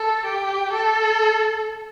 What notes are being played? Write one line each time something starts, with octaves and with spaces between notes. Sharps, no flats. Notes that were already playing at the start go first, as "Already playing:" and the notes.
Already playing: A4
G4
A4